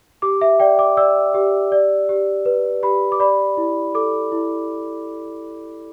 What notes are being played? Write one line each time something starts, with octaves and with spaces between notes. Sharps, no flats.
G4 D6
E5
D5 G5
D6
D5 E6
G4
D5
G4
B4
G4 B5
D6
D5 B5
E4
A4 D6
E4